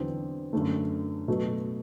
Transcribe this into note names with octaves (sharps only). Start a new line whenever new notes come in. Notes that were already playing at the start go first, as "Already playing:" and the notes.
Already playing: E2 D3 F#3 C4
F#2 D3 A3
B2 F#3 A3